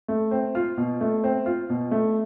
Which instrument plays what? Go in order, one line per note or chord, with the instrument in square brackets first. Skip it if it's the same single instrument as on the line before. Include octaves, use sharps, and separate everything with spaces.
[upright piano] A3
C4
F4
B2
A3
C4
F4
B2
A3